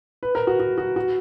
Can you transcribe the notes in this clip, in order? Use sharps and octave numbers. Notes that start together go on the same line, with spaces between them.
B4
A#4
F#4
F#4
F#4
F#4